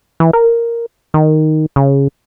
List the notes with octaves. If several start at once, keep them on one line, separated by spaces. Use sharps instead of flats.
E3
A#4
D#3
C#3